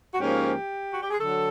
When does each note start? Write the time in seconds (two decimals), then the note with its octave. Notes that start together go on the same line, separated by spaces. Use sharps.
0.13 F#4
0.17 G#2 F3 A#3 C#4 G4
0.92 F#4
1.01 G4
1.11 G#4
1.20 D3 F#3 A4